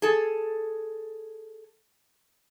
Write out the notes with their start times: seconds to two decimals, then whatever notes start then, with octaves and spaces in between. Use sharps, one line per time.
0.02 G#4 A4